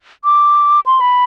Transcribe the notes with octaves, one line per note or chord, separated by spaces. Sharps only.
D6
C6
B5